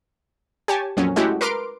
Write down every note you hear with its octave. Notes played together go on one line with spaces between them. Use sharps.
G4 C#5 G#5 A5
F2 A#2 F#3 C#4
G#3 A3 C#4 E4 F#4 G4
A#4 B4 C6 D6 F6 D7